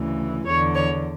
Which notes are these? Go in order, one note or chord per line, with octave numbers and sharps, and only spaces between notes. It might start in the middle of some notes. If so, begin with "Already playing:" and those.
Already playing: D2 C#3 E3
E2 D3 C#5
C#5